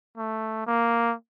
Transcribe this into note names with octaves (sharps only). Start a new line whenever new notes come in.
A3
A#3